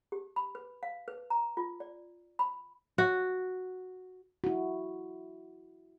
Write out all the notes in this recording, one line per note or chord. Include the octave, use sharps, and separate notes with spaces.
G4
B5
B4
F5
B4
A#5
F4
D5
B5
F#4
E4 F#4